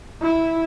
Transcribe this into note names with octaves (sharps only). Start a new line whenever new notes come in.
E4